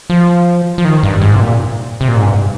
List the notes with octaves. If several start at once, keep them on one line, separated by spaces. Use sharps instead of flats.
F3
F3
D#3
G2
G#2
C3
A#2
C3
A#2
G#2
G2